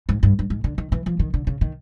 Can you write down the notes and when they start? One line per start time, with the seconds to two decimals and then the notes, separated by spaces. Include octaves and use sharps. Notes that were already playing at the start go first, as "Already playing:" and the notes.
0.09 G#2
0.23 G2
0.39 G2
0.50 G#2
0.64 D3
0.78 D#3
0.92 E3
1.06 F3
1.19 D#3
1.34 D3
1.47 C#3
1.61 D#3